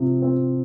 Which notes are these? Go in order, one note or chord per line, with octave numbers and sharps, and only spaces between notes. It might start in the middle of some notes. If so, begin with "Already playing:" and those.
Already playing: C3 F3 C4
C4